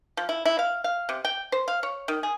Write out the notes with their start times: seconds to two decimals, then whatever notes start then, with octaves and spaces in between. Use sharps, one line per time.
0.17 F3
0.29 E4
0.45 E4
0.59 F5
0.84 F5
1.09 C3
1.25 G5
1.52 C5
1.68 F5
1.83 C#5
2.08 D#3
2.23 G#4